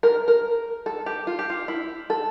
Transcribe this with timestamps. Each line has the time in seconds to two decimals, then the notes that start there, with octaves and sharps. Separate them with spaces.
0.03 A#4
0.28 A#4
0.86 A4
1.06 G4
1.27 F4
1.39 G4
1.50 F4
1.68 E4
2.10 A4